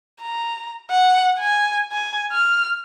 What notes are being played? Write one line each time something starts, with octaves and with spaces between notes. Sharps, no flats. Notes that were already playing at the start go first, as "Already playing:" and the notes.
A#5
F#5
G#5
G#5
F6